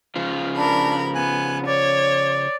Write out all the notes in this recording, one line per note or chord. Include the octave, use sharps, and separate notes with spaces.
C#3 F3 F4
D4 A#4 B5
B3 G#5 F#6
C#5 D5